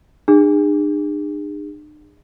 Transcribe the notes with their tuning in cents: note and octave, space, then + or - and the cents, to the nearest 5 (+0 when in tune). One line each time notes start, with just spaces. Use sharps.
D4 +45 G#4 -35